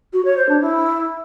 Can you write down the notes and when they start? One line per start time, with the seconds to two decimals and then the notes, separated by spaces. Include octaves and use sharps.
0.13 F#4
0.25 C#5
0.37 C5
0.49 D4
0.61 E4